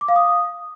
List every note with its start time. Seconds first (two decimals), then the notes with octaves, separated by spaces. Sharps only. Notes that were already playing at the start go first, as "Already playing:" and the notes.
0.01 D6
0.08 F5
0.16 D#6